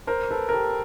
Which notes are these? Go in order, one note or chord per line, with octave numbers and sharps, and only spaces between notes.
A#4 C5
A4 B4
A#4
G4 A4